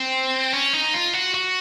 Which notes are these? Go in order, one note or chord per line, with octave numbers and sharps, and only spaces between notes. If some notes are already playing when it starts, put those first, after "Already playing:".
Already playing: C4
C#4
D#4
F4
F#4
F#4